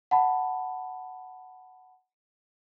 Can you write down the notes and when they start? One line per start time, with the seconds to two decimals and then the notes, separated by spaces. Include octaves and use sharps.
0.11 F#5 A5 B5